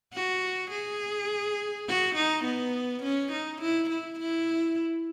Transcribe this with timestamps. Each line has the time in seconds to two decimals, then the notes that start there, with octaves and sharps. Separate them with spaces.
0.13 F#4
0.71 G#4
1.87 F#4
2.16 D#4
2.44 B3
3.02 C#4
3.32 D#4
3.61 E4
3.90 E4
4.20 E4